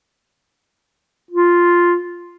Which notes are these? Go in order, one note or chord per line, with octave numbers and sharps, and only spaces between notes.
F4